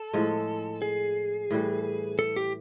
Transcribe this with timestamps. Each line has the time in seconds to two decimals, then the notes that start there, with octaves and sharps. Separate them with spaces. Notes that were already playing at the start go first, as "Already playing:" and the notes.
Already playing: A4
0.13 A2 F3 G#3
0.82 G#4
1.51 A2 E3 G3
2.19 A4
2.36 G4